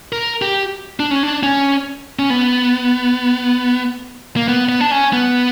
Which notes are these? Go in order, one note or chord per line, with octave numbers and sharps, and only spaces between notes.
A#4
G4
D4
C#4
D4
C#4
C#4
B3
A#3
B3
B3
D4
C#4
B3